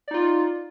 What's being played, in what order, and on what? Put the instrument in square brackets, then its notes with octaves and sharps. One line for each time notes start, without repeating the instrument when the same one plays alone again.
[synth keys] D5
D#4
F4